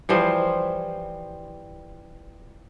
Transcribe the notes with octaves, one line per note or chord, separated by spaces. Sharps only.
E3 F3 G3 C5